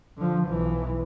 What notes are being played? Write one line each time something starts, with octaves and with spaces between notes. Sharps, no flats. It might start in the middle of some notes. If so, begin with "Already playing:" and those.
D3 F3
B1 E3